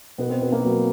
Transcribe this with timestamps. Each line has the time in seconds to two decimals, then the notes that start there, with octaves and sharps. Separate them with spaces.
0.18 B2 B3
0.29 C4
0.41 B2 B3
0.52 A#3
0.64 F#3